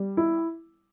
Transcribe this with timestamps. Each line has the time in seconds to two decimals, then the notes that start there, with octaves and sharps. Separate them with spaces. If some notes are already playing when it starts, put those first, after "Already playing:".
Already playing: G3
0.17 E4